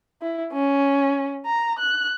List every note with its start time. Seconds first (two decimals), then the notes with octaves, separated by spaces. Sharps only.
0.22 E4
0.53 C#4
1.46 A#5
1.79 F#6